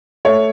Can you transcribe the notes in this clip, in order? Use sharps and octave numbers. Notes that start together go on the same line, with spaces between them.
A3 C#5